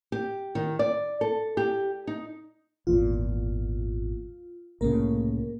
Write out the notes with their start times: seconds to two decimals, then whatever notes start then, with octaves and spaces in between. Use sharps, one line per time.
0.12 G4
0.55 D#3
0.79 D5
1.21 A4
1.57 G4
2.07 D#4
2.87 G#1 E2 A#2 F4
4.81 C2 A2 C#3 A#3 A#4